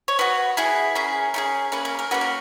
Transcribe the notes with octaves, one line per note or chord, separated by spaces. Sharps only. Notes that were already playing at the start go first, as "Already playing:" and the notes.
C#5
B3 F#4 B4
B3 E4 G#4
C#4 G#4 A#4
C#4 E4 G#4
A#3 C#4 G#4 B4
A#4
A#4
A#3 C#4 F#4 B4
A#4